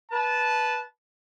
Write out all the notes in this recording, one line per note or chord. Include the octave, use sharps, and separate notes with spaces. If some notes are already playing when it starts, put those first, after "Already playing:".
B4 A5